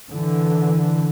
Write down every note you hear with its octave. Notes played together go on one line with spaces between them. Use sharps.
D3 E3